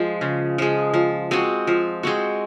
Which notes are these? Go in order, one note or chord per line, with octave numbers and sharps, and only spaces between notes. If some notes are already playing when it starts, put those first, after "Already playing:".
Already playing: F3 G#3
C#3
F3 G#3
F3
G#3 C4 F#4
F3
G#3 C4 F#4